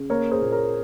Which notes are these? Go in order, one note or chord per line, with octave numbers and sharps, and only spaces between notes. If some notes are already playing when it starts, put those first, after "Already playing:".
Already playing: C#3
A#3 A#4 C#5
G#4 C5
A#2
A#4 C#5